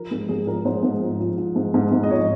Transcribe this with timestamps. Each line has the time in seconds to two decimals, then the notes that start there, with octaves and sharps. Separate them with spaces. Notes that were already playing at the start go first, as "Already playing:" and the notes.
Already playing: F3 A#4
0.11 G#2 A#4
0.29 G#2 G#4
0.47 F3 A#4
0.65 G#2 C5
0.83 G#2
1.02 F3
1.20 F3
1.38 F3
1.56 G#2
1.74 G#2
1.92 G#2
2.03 D#5
2.10 F3 C#5